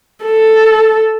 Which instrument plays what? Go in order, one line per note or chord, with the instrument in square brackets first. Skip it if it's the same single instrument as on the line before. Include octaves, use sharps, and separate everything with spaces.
[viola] A4